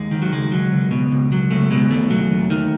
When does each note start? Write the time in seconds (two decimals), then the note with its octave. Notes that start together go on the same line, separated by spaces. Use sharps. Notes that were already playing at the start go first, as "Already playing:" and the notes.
Already playing: D#2 G#3
0.11 D#3
0.22 F#3
0.32 C#2 G#3
0.52 F#3
0.71 C#2
0.91 B2
1.12 C#2
1.32 F#3
1.51 C#2 A3
1.71 B2 G#3
1.91 D#2 A3
2.10 F#3
2.30 D#2
2.50 D#3